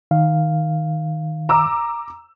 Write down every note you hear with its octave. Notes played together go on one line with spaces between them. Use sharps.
D#3 F5
A#5 D6 E6